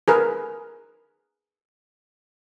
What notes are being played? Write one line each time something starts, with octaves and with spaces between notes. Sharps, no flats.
G#4 A#4 B4